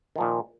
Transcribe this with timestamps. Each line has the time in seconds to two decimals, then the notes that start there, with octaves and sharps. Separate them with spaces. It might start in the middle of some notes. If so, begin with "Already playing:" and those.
0.16 D#3
0.18 F3
0.21 A#2